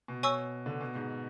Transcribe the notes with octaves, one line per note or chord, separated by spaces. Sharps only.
B2
C#5 G#5 C#6 E6
D3
B2
G#2